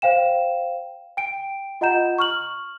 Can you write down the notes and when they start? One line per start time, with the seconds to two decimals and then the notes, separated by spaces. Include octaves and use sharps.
0.02 C5 F5 G5 E7
1.17 G5 D7
1.81 F4 D#5 F#5 A#5 G6 E7
2.18 C#6 F6 F#7